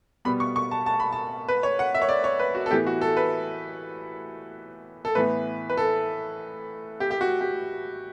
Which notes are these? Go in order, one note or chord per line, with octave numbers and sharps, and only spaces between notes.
B2 G3 B3 B5
C#6
C#6
A5
A5
B5
A5
B4
C#5
F#5
E5
C#5
D5
C#5
B4
F#4
A4
A2 E3 B3 G4
F#4
A4
B4
A4
A2 E3 B3 B4
B4
A4
G4
G4
F#4
G4